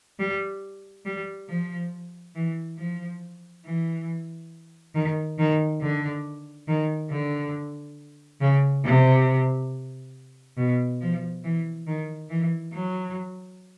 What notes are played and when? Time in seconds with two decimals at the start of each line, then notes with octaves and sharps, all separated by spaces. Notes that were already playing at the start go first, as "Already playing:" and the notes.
0.19 G3
1.06 G3
1.49 F3
2.35 E3
2.79 F3
3.65 E3
4.95 D#3
5.39 D#3
5.82 D3
6.68 D#3
7.11 D3
8.41 C#3
8.85 C3
10.57 B2
11.01 F3
11.44 E3
11.87 D#3
12.30 E3
12.74 F#3